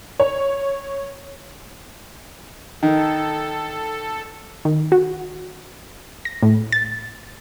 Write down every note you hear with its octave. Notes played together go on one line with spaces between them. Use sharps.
C#5
D#3 A4
D#3
F#4
A#6
A2
A6